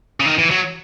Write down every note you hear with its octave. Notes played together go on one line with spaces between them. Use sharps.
C#3
D#3
E3
F#3